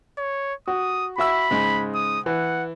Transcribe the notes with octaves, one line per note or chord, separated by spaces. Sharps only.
C#5
F#4 D#6
F#4 E5 B5 E6
G#2 C#3 G#3
D#6
E3 F#5